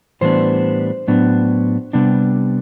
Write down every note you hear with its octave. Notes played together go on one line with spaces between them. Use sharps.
A2 E3 G3 B3 D4 C5
A2 F#3 B3 D4
C3 G3 B3 D4